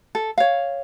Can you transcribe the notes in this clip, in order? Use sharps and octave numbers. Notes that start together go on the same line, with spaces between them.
A4
C#5 F5